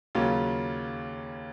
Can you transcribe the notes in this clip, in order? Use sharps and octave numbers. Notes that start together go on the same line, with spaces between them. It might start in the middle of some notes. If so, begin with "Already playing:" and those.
D#2 C#3 F#3 C#4 F4